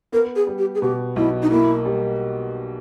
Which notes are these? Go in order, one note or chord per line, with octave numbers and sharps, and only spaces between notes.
B3 A#4
G#4
G3
G4
G#4
B2 G4
B1 E4
D#4
A#3 E4
G3